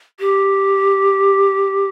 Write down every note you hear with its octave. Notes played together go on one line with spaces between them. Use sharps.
G4